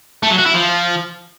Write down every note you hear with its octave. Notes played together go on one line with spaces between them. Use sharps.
A3
F#3
F#4
E4
F3